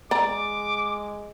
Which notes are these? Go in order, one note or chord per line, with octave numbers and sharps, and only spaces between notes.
G#3 D5 A#5 D6